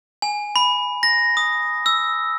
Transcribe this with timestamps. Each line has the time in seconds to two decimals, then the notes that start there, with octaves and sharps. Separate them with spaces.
0.22 G#5
0.56 B5
1.03 A#6
1.37 D#6
1.86 E6